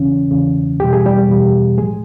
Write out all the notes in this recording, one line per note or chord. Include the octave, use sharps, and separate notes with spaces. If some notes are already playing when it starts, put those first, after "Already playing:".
Already playing: E2 C#3 E3 C#4
E2 C#3 E3
E2 B2 G3 G4
G#4
G3 G4
E2 B2 G3
A2 F3 G#3 G#4